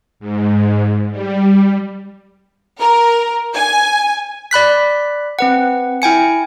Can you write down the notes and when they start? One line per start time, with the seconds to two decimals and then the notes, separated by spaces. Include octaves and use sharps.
0.20 G#2
1.11 G3
2.79 A#4
3.54 G#5
4.51 D5 B5 F#6 B6
5.39 C4 B4 F#5
6.02 E4 G5 G#5 C#7